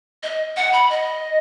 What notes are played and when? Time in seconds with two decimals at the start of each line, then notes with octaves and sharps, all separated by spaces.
0.23 D#5
0.56 F#5
0.73 B5
0.90 D#5